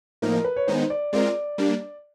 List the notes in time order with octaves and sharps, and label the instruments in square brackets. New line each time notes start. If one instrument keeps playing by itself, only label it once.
[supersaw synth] A2 F3 A#3 D#4 [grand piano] A#4
[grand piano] B4
C#5
[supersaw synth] D#3 G#3 B3 D#4 [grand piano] C5
[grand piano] D5
[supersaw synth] G#3 C4 F4 A#4 [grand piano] D5
[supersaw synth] G3 A#3 D4